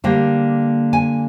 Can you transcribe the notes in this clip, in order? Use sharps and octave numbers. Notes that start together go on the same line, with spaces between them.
D3 G3 A#3 G5
G#5